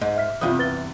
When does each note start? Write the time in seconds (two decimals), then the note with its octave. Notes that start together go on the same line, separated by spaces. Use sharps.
0.01 G#2 D#5
0.16 E5 F6 B6
0.41 E2 G2 C3 F4 F5 D#6
0.59 B4 A6 G7